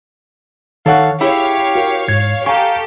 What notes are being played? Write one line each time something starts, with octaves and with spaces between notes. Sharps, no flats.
D#3 A4 C#5 F5 F#5
E4 G4 G#4 C#5 F5
F#4 A#4
G#2 G#6
G4 A4 F5 G#5 A#5 C#6